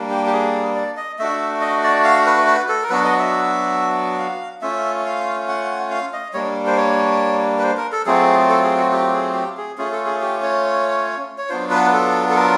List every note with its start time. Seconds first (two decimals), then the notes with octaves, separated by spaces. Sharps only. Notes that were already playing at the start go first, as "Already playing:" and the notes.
Already playing: G3 A#3 D4
0.11 G4
0.26 G4
0.33 G#4
0.76 D5
0.97 D#5
1.19 A3 D4 F#4 E5
1.61 D#5
1.83 D5
2.04 F5
2.26 B4
2.47 B4
2.69 A4
2.83 A#4
2.90 F#3 B3 D4 F#4 B4
3.04 D#5
3.18 E5
4.19 F5
4.62 A3 C#4 F4 E5
5.05 F5
5.48 F#5
5.90 F5
6.13 D#5
6.33 G3 A#3 D4 C#5
6.66 C5
6.77 C#5
7.58 B4
7.63 C5
7.77 A#4
7.92 A4
8.06 F#3 A3 C4 F4 G#4
8.49 A4
8.64 G#4
8.77 F#4
8.92 G4
9.14 G#4
9.34 G4
9.57 G#4
9.78 A3 C#4 F4 G#4
9.92 A4
10.06 G#4
10.21 G4
10.43 C#5
11.38 C#5
11.49 F#3 B3 D4 F4 C5
11.71 B4
11.93 A4
12.30 A4
12.36 A#4